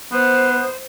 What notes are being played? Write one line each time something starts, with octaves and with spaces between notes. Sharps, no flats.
B3 C5